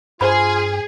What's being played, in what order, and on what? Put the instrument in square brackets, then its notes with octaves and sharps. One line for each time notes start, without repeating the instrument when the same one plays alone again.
[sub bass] G2 [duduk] F4 [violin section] G#4 [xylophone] C5 B5